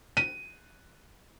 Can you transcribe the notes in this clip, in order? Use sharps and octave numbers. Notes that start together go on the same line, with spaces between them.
D#7